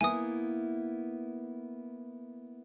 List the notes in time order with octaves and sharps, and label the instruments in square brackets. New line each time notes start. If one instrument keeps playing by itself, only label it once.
[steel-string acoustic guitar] A#3 B3 E4 [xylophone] G#5 D#6